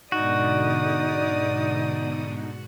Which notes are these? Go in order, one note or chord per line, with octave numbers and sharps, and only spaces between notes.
G#2 B2 D3 D#4 F#4 D5 D#6